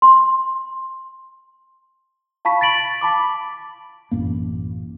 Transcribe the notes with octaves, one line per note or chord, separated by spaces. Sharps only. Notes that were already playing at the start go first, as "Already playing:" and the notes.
C6
F5 A5 B5 C#6 B6
A6 B6 D7 F#7
A5 B5 D6
A1 F#2 A#3